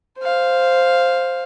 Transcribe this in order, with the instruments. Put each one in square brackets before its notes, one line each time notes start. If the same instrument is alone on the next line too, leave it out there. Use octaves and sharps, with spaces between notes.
[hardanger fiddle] C5 F5